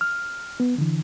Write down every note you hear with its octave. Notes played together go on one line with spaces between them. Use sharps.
F6
B3
D3 E3